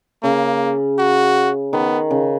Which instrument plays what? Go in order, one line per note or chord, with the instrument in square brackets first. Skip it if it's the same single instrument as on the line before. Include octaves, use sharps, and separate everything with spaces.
[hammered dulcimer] C#3 [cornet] A#3
[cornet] F#4
[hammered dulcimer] D#3 [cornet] B3
[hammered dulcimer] C#3